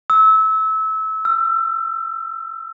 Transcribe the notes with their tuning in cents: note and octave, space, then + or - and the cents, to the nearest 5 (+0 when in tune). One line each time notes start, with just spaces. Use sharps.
E6 -25
E6 +35